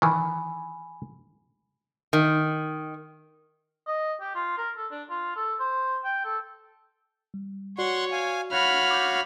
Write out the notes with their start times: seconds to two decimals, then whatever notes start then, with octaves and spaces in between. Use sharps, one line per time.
0.02 D#3 E3 G#5 B5
2.13 D#3
3.87 D#5
4.21 G4
4.35 F4
4.58 A#4
4.77 A4
4.91 D4
5.10 F4
5.36 A4
5.59 C5
6.04 G5
6.25 A4
7.34 G3
7.79 F#4 C#5 D5 F#5 C6 C#6
8.12 F5 G#5
8.52 F#4 C#5 F5 B5 F6 F#6
8.90 D6 G6